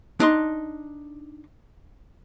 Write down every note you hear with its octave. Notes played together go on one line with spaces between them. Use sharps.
D4 D#4 C6